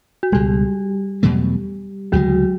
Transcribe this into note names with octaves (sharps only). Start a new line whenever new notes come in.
F#4
C#2 B2 G3 G#3 G4
E2 B2 F#3 A3
D2 C#3 E3 F#3 G#3 F#4